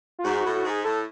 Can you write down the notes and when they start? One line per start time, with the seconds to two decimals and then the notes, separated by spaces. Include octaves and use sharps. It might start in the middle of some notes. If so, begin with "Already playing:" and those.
0.19 F4
0.24 G#2 F#4
0.40 A2 F#4
0.55 F#4
0.65 G#2 G#4
0.84 A2 A4